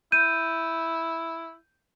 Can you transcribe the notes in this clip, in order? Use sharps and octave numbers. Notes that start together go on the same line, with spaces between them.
E4 G6 D#7